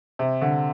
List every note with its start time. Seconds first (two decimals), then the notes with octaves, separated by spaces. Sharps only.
0.19 C3
0.42 D3